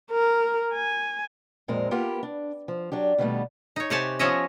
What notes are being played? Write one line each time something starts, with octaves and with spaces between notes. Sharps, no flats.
A#4
G#5
F2 A#2 G#3 C4 A#4
A#3 B3 F4 G4 A#4 B4
D4
F3
F#3 D4 G4
B2 D#3 F#3 G3 A3 B3
D#4 C#5
C3 G4 C#5 F#5 G#5 A5
F3 B3 C#4 C#5 D#5 E5